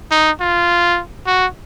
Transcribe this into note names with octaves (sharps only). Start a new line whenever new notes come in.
D#4
F4
F#4